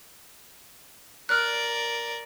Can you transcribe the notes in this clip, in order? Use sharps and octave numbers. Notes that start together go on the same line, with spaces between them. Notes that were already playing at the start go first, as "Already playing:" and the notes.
A#4 D5 F6 F#6